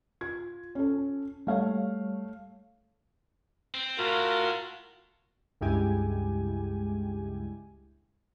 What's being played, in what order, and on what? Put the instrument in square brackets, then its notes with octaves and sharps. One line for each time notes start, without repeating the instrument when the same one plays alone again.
[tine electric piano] F4 [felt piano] G#6
[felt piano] C#4 A4
[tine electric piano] G3 C#5 [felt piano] A3 F5
[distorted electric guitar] C4
[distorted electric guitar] A2 [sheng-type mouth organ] F4 F#4 A#4
[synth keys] C#2 G2 G#3 E4 G4 G#5